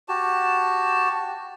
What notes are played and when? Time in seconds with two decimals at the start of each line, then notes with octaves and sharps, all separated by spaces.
0.09 F#4 G4 A5